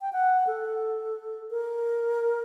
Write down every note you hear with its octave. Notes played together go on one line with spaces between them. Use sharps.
G5
F#5
A4
A#4